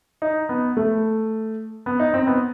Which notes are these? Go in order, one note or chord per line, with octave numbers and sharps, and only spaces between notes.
D#4
B3
A3
B3
D#4
C4
B3